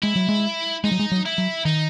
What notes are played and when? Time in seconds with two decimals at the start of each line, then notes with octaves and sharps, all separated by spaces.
0.03 G#3 E4
0.16 F#3
0.29 G#3
0.84 G#3 D#4
0.92 F#3
0.99 G#3
1.12 F#3
1.25 E4
1.38 F#3
1.65 D#3 D#4